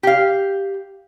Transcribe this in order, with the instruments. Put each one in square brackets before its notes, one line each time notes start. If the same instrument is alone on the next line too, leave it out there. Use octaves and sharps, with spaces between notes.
[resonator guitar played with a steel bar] G4 F5